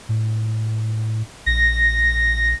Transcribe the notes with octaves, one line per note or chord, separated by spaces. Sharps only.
A2
A#1 A#6